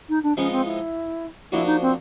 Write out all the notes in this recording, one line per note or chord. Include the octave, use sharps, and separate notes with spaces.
D#4
D4
F3 G#3 B3 C#4 D#4
C4
E4
F3 A#3 D4 E4 F#4
D#4
C4